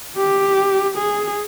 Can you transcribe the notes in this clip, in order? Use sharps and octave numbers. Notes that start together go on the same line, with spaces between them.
G4
G#4